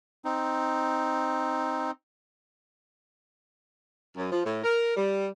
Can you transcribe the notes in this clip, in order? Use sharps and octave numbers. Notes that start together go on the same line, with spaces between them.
C4 D#4
F#2
F3
A2
A#4
G3